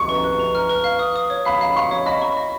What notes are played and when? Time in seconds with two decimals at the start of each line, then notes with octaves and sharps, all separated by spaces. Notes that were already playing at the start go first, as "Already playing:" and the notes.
Already playing: C#6
0.09 B4
0.24 B4
0.39 A#5
0.55 F6
0.69 B4
0.84 F5
0.99 D#6
1.16 D#6
1.30 C#5
1.45 F5 B5
1.61 F5
1.76 F5 C#6
1.91 C#5
2.06 D#5 B5
2.22 C#6
2.37 D#5